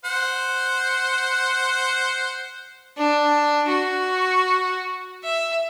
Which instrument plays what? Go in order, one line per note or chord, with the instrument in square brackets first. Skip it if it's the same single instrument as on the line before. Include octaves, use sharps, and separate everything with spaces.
[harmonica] C5 F#5
[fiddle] D4
F#4
E5